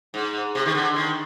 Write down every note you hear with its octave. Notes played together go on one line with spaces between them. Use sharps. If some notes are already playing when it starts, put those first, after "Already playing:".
G#2
C3
D#3
D3
D#3